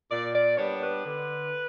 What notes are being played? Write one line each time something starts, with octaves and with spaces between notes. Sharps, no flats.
A#2 D5
D5
G3 B3 D4 C#5
B4
D3